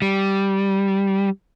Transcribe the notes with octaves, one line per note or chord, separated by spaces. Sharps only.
G3